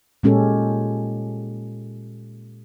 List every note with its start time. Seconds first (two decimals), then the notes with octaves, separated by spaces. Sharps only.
0.23 A#2 G#3 C#4 G4 A4